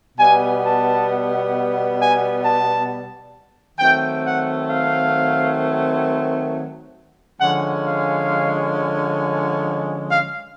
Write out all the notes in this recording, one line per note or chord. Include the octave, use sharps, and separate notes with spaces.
B2 G3 B3 G#5
A5
G#5
A5
D#3 F#3 A3 C4 G5
F#5
F5
D3 F3 G#3 C#4 F#5
F5
F5